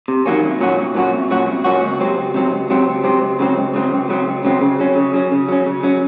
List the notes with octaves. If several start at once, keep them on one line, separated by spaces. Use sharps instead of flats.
C3
D#3 F#3 A#3 C#4
C2
A#2 F#3 C#4 F#4
C2
A#2 F#3 C#4 F#4
C2
A#2 F#3 C#4 F#4
C2
A#2 F#3 C#4 F#4
C#2
C3 F#3 C4
C#2
C3 F#3 C4
C#2
C3 F#3 C4
C#2
C3 F#3 C4
C#2
C#3 F#3 C4
C#2
C#3 F#3 C4
C#2
C#3 F#3 C4
C#2
C#3 F#3 C4
C#3
F#3 C#4
C#3
F#3 C#4
C#3
F#3 C#4
C#3
F#3 C#4